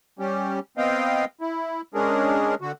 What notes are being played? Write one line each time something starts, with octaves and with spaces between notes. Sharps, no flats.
G3 C#4 G4
B3 C4 D#5 F5 G5
E4
G#3 C#4 D4 G#4 A#4
D3 F#4